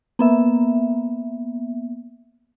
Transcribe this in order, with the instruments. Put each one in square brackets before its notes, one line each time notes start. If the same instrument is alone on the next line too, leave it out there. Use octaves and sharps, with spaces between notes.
[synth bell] A#3 B3 E5